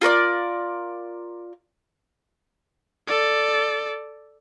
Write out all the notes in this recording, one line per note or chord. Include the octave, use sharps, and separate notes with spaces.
F4 A#4 C#5 D5
A4 D5